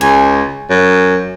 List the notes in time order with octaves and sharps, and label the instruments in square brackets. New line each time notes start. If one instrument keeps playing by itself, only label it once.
[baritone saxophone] C#2 [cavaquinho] G#5
[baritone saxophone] F#2